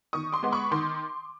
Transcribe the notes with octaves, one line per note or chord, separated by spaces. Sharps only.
D#3 C#6 D#6
C6 D6
G#3 B3
B5 C#6
D#3 C6 D6